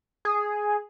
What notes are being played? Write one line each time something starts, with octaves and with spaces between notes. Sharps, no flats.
G#4